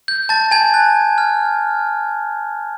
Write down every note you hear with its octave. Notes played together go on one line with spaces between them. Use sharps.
G6
A5 A6
G#5 G#6
F#6
F6